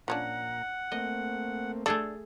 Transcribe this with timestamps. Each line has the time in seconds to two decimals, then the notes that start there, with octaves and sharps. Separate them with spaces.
0.08 A#2 F3 C#4 D4 F#5 A#5
0.92 A3 A#3 C4 D#5
1.86 A3 D4 G#4 A4